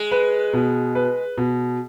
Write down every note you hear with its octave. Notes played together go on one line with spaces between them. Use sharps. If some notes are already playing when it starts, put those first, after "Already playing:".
Already playing: G#3
B4
B2
B4
B2